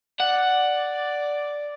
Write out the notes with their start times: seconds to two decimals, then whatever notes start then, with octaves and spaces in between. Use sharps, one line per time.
0.20 D5 F#5